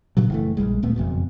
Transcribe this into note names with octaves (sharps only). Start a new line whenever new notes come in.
G2 A#2 C#3 F#3
F#1 E3 A3
A#1 F#2 G3 G#3
D1 A#2 A3 B3
F#1 F2 B2